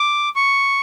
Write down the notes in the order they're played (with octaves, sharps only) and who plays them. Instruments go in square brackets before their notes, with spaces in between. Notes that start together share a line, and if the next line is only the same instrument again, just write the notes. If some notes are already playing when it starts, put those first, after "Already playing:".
Already playing: [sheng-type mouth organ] D6
C#6